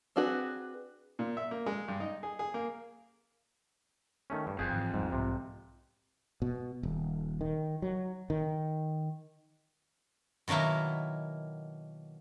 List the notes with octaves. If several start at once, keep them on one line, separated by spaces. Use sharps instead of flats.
C4 D4 F#4 G#4 B4
A#2
E5
A#3
G#3
G2
D#4
G#4
G#4
A#3
D#3 A3 C#4
G2
F#1 F2 G#4
G#2 D3 E3
G1 E2 G#2 G3
B1 G#2 C3
B2
D#1
D#3
F#3
D#3
B2 D#3 F#3 A#3 E4